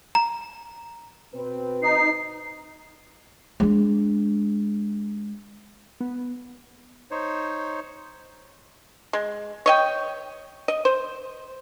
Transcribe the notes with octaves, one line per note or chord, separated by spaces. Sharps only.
A#5
B2 C4 B4
D#4 C7
G#3 D4
B3
D#4 C5 C#5
G#3
C#5 D#5 G5
D#5
C5